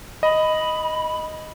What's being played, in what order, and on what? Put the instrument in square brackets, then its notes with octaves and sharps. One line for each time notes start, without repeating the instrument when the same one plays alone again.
[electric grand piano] D#5 [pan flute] B5